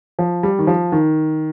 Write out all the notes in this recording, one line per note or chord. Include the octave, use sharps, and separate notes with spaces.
F3
G3
D#3
F3
D#3